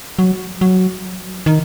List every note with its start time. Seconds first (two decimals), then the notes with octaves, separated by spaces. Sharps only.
0.19 F#3
0.61 F#3
1.46 D#3